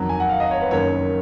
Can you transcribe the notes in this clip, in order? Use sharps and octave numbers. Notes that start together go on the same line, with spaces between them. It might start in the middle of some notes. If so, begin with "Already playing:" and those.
Already playing: F2 D#3 F#3
G#5
F#5
F5
D#5
C#5
B4
F#1 F#2 D#3 C#5